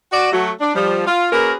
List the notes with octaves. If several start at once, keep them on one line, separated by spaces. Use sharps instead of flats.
F#4 D5
F#3 A3 F#4
D4
F3 G3
F4
A#3 C#4 F#4 G#4 A#4 B4